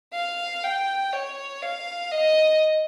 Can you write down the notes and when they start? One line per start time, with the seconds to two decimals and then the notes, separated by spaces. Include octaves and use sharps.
0.14 F5
0.64 G5
1.13 C#5
1.62 F5
2.12 D#5